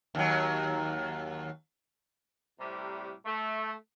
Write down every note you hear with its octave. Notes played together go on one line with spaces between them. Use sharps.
D#2 F#3
A2 C3 G3
A3